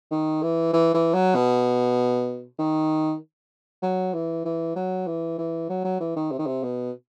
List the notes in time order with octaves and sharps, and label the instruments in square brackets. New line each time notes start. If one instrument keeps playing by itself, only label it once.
[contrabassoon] D#3
E3
E3
E3
F#3
B2
D#3
F#3
E3
E3
F#3
E3
E3
F#3
F#3
E3
D#3
C3
D#3
C3
B2